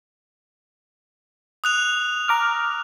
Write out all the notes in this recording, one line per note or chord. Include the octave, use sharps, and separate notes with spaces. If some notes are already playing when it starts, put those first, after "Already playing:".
D#6 F#6 F7
A#5 D6 F6